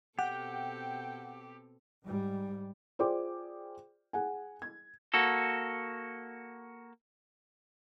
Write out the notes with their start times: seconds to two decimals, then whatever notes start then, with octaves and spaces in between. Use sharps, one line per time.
0.19 B2 C4 G4 A4 F#5 G5
2.04 G#2 G3
2.99 F4 G#4 C5 D5 G5 D6
4.13 G#4 F#5 G#5
4.62 G#6
5.14 A#3 F#4 A4